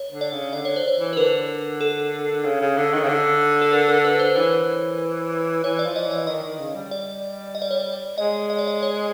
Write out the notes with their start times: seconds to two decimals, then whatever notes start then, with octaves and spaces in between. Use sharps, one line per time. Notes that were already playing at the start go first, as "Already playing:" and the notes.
Already playing: C#5
0.10 D3
0.21 D5
0.32 C#3
0.53 D3 D5
0.65 C#5
0.76 C5
0.88 C#5
0.96 E3
1.13 B4
1.17 D3 A#4
1.81 A4
2.44 C#3
2.61 C#3
2.77 D3
2.93 D#3
3.03 C#3
3.09 D3
3.61 A4
3.73 A#4
3.88 A#4
4.05 B4
4.19 C5
4.36 E3 C#5
5.63 E3 C#5
5.79 D5
5.84 F3
5.96 D#5
6.06 E3
6.11 D#5
6.27 D#3 D#5
6.43 D#3
6.59 C#3
6.75 G3
6.91 D5
7.55 D#5
7.62 D5
7.71 C#5
7.77 D5
8.18 G#3 D#5
8.50 D#5
8.59 D5
8.68 D#5
8.82 C#5